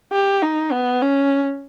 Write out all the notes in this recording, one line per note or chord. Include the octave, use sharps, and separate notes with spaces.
G4
D#4
B3
C#4